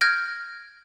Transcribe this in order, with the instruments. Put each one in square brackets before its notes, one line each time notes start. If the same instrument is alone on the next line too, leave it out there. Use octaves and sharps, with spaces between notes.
[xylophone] F6 G6 G#6 A#6 D7